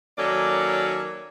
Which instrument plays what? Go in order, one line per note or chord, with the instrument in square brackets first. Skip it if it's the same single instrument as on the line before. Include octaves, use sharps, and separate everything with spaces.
[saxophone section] D#3 F#3 A#3 C#4 A4 D5